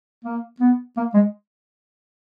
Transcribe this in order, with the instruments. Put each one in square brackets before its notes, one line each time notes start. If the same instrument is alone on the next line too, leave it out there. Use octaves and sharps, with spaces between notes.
[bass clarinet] A#3
B3
A#3
G#3